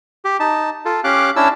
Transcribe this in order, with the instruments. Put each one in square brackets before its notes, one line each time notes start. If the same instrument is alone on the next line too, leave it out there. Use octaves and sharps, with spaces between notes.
[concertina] G4
D#4 A5
F4 A4
C#4 G4 F5 D6 F#6
C#4 D4 E4 A5 E6